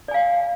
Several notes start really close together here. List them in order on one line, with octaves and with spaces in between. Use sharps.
D5 G#5 F5